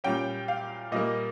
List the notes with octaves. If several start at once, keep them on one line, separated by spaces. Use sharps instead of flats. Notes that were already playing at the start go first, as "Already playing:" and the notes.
A#2 G3 C#4 G5
F5
A#2 G3 A#3 D#5